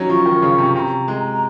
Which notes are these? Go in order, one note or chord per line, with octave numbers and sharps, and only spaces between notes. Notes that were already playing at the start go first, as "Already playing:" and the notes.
Already playing: F#3 C#4 D#4
F3 C#6
D#3
C#3
C3
C3 A#5 C#6
G#3
A#5